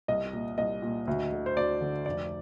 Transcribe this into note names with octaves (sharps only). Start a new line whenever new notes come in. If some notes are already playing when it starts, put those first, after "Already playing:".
C2 D#5
A#2
C2 D#5
A#2
D2
D3
C5
D2 D5
D3
F1 D5